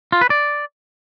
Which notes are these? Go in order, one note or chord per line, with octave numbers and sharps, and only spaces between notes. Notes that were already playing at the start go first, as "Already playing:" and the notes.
F4
B4
D5